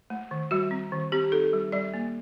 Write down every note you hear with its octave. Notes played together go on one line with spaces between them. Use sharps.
A3
D#3
G3 F#4
C4
D#3
C4 G4
D#4 A4
G3
G3 D5
A#3